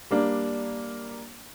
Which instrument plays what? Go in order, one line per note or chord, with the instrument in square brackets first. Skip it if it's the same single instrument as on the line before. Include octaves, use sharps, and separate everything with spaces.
[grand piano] G3 A#3 D4